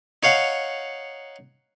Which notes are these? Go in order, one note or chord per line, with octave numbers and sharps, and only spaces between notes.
D#4 C#5 F5 F#5